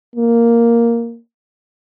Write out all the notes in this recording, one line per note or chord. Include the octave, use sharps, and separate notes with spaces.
A#3